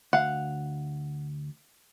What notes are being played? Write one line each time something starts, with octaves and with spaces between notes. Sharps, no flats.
D2 F5 F#5